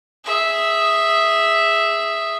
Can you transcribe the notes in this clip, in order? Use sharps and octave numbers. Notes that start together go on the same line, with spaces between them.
G#4 E5